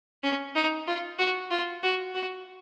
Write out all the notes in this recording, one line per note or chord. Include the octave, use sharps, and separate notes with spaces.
C#4
D#4
F4
F#4
F4
F#4
F#4